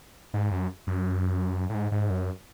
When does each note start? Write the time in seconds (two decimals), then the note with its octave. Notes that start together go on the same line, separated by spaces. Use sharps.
0.34 G#2
0.51 F#2
0.87 F#2
1.69 A2
1.75 G#2
1.92 G#2
2.10 F#2